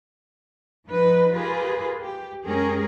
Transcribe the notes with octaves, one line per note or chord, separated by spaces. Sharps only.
F3 D#4 B4
F4 G4 G#4 A#4 B4
G4
F#2 G#3 C#4 G4 G#4 A#4